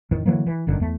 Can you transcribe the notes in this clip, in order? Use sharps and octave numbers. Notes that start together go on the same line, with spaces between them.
F2 A2 D#3
D3 E3 F#3 A#3
E3
G1 F#2 D3 D#3
E2 A3